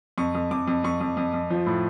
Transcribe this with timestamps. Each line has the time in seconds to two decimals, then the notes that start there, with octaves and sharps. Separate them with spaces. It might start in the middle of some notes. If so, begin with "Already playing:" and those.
0.18 F2 C#6
0.35 F2
0.51 F2 D6
0.68 F2
0.84 F2 C#6
1.01 F2
1.17 F2
1.34 F2
1.50 F3
1.66 A2